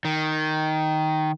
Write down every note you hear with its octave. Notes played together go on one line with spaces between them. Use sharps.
D#3